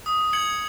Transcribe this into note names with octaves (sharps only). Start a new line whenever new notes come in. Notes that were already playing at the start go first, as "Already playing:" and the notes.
D#6
G#6 C#7 F#7